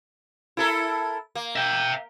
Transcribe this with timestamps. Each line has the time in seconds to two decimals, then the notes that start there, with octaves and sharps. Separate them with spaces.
0.57 E4 A4 A#4
1.35 A#3
1.56 E5 G5